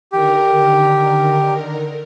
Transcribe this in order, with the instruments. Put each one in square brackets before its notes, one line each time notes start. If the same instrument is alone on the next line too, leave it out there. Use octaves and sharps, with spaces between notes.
[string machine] D3 D#3 A#4 [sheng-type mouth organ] G4